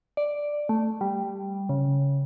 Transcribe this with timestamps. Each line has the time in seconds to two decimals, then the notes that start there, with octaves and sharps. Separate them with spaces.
0.17 D5
0.69 A3
1.01 G3
1.69 C#3